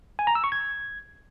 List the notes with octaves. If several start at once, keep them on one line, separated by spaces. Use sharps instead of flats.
G#5
A#5
E6
C#6
G#6